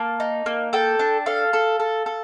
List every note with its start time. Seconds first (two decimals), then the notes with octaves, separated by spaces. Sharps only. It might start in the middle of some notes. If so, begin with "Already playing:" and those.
Already playing: A#3 A5
0.20 D#4
0.46 A#3
0.73 A4 G5
0.99 D4
1.26 A4 F5
1.53 A4
1.80 A4
2.06 A4